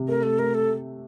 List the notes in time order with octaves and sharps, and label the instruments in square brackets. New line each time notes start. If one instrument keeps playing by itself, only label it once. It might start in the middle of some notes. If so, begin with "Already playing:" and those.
Already playing: [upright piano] C3
[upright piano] A3 [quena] A#4
[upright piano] A3 [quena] A4
[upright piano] A3 [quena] A#4
[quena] A4